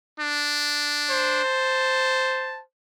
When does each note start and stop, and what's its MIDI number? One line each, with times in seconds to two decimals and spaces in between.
0.19 1.40 62
1.11 2.64 72
1.44 2.60 81